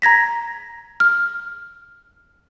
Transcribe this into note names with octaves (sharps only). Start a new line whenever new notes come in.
A#5 G#6 A#6 B6
F6